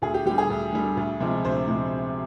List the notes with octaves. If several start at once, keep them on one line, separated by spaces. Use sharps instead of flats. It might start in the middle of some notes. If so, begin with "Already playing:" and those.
D2 G#4
G4
D3 G3 G4
G#4
D2
D3 G3
D2
C3 F3 G#3
D2 C5
C3 F3 G#3